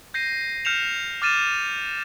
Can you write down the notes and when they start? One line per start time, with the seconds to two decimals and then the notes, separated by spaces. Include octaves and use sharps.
0.14 G6 A#6 C7 D#7
0.65 F6 G6 C7 C#7 E7 F7
1.22 D6 F6 A6 D#7 E7